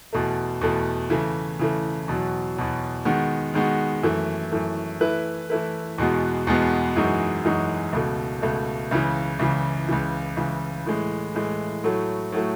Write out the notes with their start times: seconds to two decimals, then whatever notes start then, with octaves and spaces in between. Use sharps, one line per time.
0.13 E2 B2 A3
0.61 E2 B2 A3
1.10 C#3 E3 A3
1.59 C#3 E3 A3
2.08 E2 B2 F#3
2.57 E2 B2 F#3
3.05 D#3 G#3 B3 F#4
3.54 D#3 G#3 B3 F#4
4.03 F#2 E3 A3
4.52 F#2 E3 A3
5.01 E3 A3 E4 B4
5.50 E3 A3 E4 B4
5.98 E2 B2 G#3 B3 F#4
6.47 E2 B2 G#3 B3 F#4
6.96 F#2 E3 G#3 D#4 F#4
7.45 F#2 E3 G#3 D#4 F#4
7.93 C#2 B2 A3
8.42 C#2 B2 A3
8.91 C#2 C#3 E3
9.39 C#2 C#3 E3
9.89 C#2 C#3 E3
10.37 C#2 C#3 E3
10.86 A2 E3 G#3
11.34 A2 E3 G#3
11.84 A2 F#3 A3
12.32 A2 F#3 A3